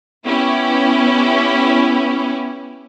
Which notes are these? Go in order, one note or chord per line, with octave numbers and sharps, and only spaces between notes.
B3 C#4 E4 G4